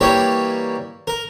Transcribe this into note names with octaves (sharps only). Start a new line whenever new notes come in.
E3 G3 A#3 G4 C#5
A#4